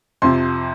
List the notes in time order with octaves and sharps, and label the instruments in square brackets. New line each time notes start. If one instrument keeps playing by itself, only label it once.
[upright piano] F2 C3 F3 C6